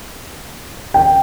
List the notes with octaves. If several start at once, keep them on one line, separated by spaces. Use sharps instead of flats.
G5